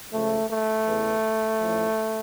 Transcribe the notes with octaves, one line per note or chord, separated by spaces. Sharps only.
C#2 C#3 F3 A3
A3
E2 C#3 E3
A1 A2 F3